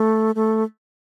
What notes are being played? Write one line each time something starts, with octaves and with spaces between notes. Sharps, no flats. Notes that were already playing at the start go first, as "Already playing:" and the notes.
Already playing: A3
A3